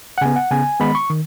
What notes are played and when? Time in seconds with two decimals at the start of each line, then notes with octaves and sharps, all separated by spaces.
0.18 F#5
0.21 C#3 B3 G#5
0.36 F#5
0.51 C#3 B3 G#5
0.80 D#3 G#3 B3 B5
0.95 C#6
1.10 D#3